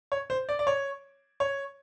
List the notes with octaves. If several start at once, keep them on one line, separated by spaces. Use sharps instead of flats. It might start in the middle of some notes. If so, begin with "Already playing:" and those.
C#5
C5
D5
D5
C#5
C#5